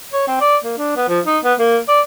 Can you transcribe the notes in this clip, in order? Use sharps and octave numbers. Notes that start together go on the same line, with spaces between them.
C#5
C4
D5
A#3
D4
B3
F3
D#4
B3
A#3
D5